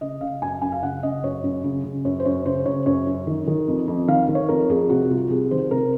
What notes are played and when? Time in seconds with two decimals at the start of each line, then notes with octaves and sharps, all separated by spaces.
0.01 C#3 D#5
0.21 C#3 F5
0.42 F#2 G#5
0.62 F#2 G#5
0.72 F5
0.83 C#3 F#5
1.03 C#3 D#5
1.23 F#2 C#5
1.44 F#2
1.64 C#3
1.84 C#3
2.05 F#2 C#5
2.20 C5
2.25 F#2 C#5
2.46 C#3 C5
2.66 C#3 C#5
2.86 F#2 C#5
3.07 F#2
3.27 D#3
3.47 D#3
3.68 F2
3.88 F2
4.08 D#3 F5
4.28 D#3
4.35 C#5
4.49 F2 A#4
4.69 F2 G#4
4.90 C3 F#4
5.11 C2 F4
5.30 C2 G#4
5.51 D#3 C5
5.71 C3 A#4